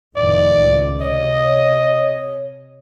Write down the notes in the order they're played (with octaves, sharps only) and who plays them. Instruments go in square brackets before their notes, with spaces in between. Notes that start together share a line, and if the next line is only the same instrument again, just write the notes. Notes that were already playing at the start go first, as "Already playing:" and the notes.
[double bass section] F1 A2 D#3 [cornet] D5
[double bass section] C#2 A2
[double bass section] C3 [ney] C#5 [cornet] D#5